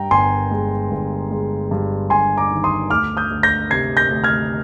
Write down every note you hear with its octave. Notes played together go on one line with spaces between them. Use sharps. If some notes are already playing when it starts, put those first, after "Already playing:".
Already playing: G2 G5 A#5
G1 G#5 C6
G#3
G1
G#3
G2
G2 G#5 C6
A#5 D6
D#3
C6 D#6
D2 D6 F6
D#6 G6
D2
G6 A#6
C3 G#6 C7
G6 A#6
D2
F6 G#6